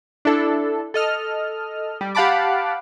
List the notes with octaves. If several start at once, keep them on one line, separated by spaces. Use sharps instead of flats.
D4 E4 A4
A4 D#5 F6
G3
G4 F5 F#5 A5 B5 D6